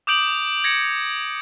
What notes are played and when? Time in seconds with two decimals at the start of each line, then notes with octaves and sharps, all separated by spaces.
0.07 D6 D#6 G6 D7 F#7
0.64 G#6 A#6 C#7